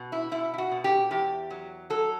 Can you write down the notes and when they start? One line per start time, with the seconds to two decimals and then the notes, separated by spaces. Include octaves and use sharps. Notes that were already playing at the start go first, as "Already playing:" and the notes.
Already playing: B2
0.12 E4
0.31 B2 E4
0.54 E4
0.58 F#4
0.71 B2
0.84 G4
1.11 E2 G4
1.50 F#3
1.90 F#3 A4